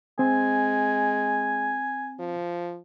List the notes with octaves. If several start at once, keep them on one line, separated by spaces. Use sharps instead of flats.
G#3 C4 G#5
F3